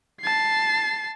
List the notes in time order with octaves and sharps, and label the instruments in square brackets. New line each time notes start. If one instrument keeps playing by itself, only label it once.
[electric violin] A5 C7